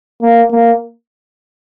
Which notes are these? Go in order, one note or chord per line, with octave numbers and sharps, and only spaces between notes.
A#3
A#3